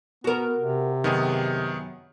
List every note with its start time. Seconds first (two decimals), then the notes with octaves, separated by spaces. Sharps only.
0.24 B3 F#4 A#4
0.58 C3
1.04 F#2 D#3 B3 G#4